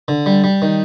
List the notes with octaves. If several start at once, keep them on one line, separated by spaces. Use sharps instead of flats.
D3
G3
G3
D#3